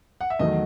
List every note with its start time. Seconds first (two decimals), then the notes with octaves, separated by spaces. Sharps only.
0.21 F#5
0.30 E5
0.39 E2 D#3 F#3 A3 D#5